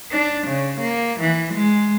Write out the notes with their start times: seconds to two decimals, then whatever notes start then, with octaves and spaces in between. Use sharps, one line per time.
0.11 D4
0.47 C#3
0.81 A#3
1.20 E3
1.54 G#3